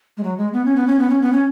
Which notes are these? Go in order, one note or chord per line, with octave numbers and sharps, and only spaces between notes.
G#3
F#3
G#3
B3
C#4
B3
C#4
B3
C#4
B3
C#4